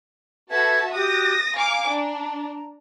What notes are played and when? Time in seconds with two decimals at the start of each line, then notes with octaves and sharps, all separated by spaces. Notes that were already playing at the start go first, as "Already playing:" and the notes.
0.51 F#4 A4 B4 E5 A5 G#6
0.94 F#4 G4 D#6 F#6 A#6
1.56 F5 G#5 A#5 D6
1.89 D4